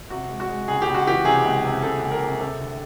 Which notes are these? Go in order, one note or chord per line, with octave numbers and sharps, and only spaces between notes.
C3 F#4
G#3
F#4
G#3
C#2 G#4
G4
C#2
F#4
E3 G4
C3 G#4
C#2
C3
C3 A4
C#2
A#4
C3
C3 A4
D2